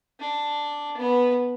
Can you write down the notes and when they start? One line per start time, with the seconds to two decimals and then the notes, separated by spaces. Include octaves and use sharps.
0.20 D4
0.97 B3